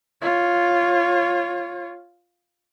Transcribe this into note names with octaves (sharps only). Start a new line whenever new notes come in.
F4 C#5